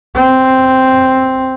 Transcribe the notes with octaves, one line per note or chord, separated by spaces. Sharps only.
C4